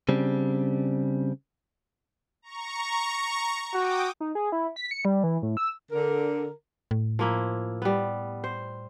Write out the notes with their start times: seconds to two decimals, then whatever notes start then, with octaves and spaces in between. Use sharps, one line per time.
0.09 C#3 G3 C4 D4
2.42 A#5 C#6
3.74 F#4 G5 D6 D#6
4.20 D#4
4.35 G#4
4.52 E4
4.76 B6
4.91 C#7
5.05 G3
5.23 E3
5.42 A2
5.57 E6
5.91 D3 A#4
6.91 A2
7.19 F3 A#3 E4
7.82 G3 B3
8.44 C5